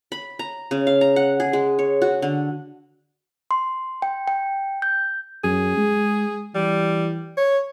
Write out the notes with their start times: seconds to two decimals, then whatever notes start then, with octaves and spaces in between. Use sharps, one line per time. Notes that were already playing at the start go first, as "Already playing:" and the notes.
0.12 B5
0.39 A#5
0.71 C#3
0.87 F5
1.01 A#5
1.16 F#5
1.40 G#4
1.53 G#3
1.79 C#5
2.02 F#4
2.22 D3
3.51 C6
4.02 G5
4.28 G5
4.82 G6
5.44 F#2 G#4
5.77 G#3
6.55 E3 G3
7.37 C#5